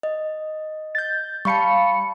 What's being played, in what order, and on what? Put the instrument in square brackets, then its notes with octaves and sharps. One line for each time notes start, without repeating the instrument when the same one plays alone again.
[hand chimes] D#5
[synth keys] G6 A6
[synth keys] G3 F5 C#7 [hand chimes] A5 B5 C#6